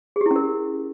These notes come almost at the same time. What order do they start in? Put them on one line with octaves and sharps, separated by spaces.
G#4 G4 E4 C#4 A#4